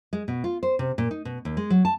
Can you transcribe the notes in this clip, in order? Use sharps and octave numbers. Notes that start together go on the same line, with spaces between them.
G#3
B2
F4
C5
C3
A#2
D#4
B2
D#2
G#3
F#3
A5